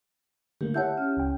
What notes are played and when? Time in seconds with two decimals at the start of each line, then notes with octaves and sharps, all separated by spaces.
0.61 D3 A3 A#3 G4
0.74 E4 C#5 E5 F#5 A5 G6
0.97 C#4 F6
1.17 C#2 G5